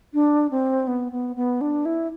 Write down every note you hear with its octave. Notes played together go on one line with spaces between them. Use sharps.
D4
C4
B3
B3
B3
D4
E4